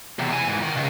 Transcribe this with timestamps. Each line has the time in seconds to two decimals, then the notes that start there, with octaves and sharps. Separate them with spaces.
0.19 E2 C3
0.32 E4 G#5
0.47 G#2 E3
0.62 D#3
0.76 C#2